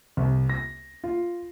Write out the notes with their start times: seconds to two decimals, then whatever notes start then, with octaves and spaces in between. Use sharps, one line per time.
0.17 C2
0.49 A#6
1.04 F4